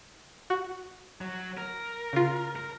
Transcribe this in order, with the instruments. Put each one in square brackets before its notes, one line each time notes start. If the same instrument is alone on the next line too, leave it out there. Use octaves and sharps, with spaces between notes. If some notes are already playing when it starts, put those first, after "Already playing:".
[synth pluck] F#4
[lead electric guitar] F#3
A#4
[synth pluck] C#3 F4
[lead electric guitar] A#4